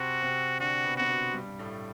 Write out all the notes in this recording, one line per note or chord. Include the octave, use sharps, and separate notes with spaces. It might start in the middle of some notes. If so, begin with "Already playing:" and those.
Already playing: C3 C4 F#4
C3 C4
D3 D4 F#4
B2 B3
C4 F#4
B2 B3
G2 G3
A2 A3